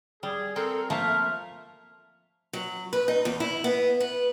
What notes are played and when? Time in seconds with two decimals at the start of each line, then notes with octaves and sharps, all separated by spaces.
0.23 G3 G#4
0.56 C4 A4 A#4
0.90 F3 A3 A#3 E5 F6
2.53 F#3
2.93 B4
3.08 D#4
3.25 E2
3.40 E4
3.64 B3
4.00 B4